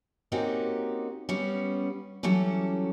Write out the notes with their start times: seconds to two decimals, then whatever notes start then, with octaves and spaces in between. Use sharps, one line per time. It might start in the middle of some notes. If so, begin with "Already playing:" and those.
0.32 A#3 C4 C#4 D#4 F#4 G4
1.29 G3 B3 C#4
2.23 E3 F#3 G3 C#4 A4